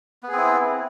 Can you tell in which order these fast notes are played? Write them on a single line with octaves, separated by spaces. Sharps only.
B3 G#4 C4 E4